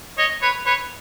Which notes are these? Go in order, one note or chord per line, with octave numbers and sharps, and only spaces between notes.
C#5 D#5
B4 C#5
B4 C#5